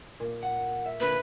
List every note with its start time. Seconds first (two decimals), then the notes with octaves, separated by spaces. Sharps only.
0.20 A#2
0.43 F#5
0.86 E5
1.00 A#2 D3 A#3 B4